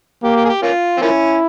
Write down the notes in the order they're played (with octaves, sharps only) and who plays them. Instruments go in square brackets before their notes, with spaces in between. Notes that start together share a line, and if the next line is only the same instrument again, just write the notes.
[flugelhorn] A#3 [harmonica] G4
[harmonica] G4
G#4
G4
A#3 C#4 F4
C4
[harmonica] F3 A#3 C#4 [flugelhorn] E4